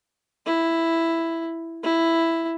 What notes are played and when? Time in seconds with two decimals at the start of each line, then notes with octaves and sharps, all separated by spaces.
0.46 E4
1.83 E4